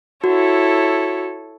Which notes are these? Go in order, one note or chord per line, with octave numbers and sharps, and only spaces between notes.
E4 F#4 A4 C#5